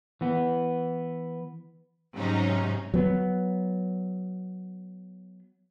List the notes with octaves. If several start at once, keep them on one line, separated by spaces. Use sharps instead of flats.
E3 B3
G#2 C3 F#3 C#4 D#4
F#3 B3